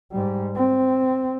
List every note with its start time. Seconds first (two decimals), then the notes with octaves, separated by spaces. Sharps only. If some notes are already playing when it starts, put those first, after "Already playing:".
0.12 G#2 G3
0.55 C4